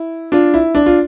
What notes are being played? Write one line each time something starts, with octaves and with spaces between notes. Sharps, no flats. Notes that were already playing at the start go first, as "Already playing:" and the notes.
Already playing: E4
D4 F4
E4
D4
F4